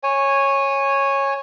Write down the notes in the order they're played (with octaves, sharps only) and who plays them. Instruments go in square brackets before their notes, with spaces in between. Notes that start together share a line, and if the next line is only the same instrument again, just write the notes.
[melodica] C#5 G#5